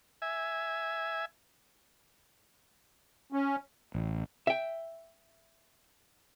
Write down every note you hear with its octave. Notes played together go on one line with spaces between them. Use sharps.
E5 G#5
C#4
A1
E5 G5